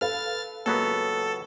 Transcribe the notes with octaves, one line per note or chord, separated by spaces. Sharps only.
A4 B4 F5 F6 A6
C#2 F#3 A#3 B3 A4